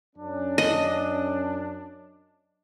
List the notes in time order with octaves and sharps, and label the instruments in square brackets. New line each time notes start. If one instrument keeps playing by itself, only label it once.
[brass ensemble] F#2 C#4 D4
[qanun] D#5